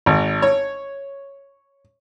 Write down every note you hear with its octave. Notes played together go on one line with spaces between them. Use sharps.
G#1
C#5